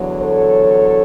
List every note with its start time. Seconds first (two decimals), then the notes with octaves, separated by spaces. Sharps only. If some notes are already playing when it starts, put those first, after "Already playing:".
Already playing: E2 D3 F#3
0.21 A4 C#5